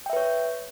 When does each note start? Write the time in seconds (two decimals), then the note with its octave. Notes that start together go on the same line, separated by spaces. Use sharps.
0.06 G5
0.10 E5
0.13 B4
0.17 C#5